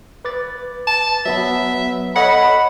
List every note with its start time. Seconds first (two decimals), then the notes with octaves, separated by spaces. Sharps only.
0.25 B4 D6 A6
0.87 A5
1.26 F#3 B3 E5 B5
2.16 A4 C#5 D#5 F#5 B5